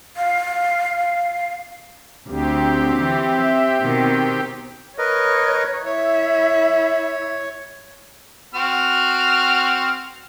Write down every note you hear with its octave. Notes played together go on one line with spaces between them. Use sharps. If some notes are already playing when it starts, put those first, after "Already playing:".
F5
D2 C4 G4
E3
E5
B2 D#3
A#4 B4 C#5 D#5
E4 C#5 E5
C4 F#4 F6